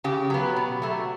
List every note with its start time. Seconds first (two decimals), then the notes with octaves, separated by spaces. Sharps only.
0.04 C#3 G4
0.30 F#3 B3
0.56 B2
0.82 F#3 A3